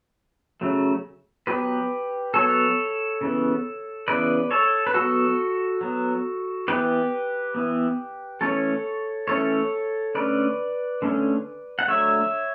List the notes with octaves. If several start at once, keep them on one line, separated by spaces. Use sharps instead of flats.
C#3 F#3 A3
F#3 B3 G4 B4
F#3 B3 A4 C#5
C#3 E3 B3
C#3 E3 B3 B4 D5
A4 C#5
B4
F#3 B3 F#4 A4
F#3 B3
E3 B3 G4 B4
E3 B3
E3 A3 C#4 A4 C#5
E3 A3 C#4 A4 C#5
D3 A3 C#4 B4 D5
D3 A3 C#4
F#5
D3 F#3 A3 C#5 E5